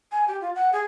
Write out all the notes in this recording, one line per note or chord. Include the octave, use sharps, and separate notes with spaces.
G#5
G4
F4
F#5
G#4